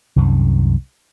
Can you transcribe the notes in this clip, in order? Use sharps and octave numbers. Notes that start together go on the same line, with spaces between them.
C2 F#2 C3 D#3